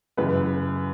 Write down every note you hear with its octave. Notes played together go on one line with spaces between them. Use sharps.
F#2 C#3 E3 B4